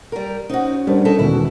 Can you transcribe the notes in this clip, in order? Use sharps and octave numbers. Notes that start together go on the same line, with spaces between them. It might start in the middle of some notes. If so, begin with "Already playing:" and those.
G3 A#4
C#4 D#4 F#4 C5
A2 G3 B3 D4 A#4 C5
D#4 E4 A4
E1 B2 D#3 E4 F#4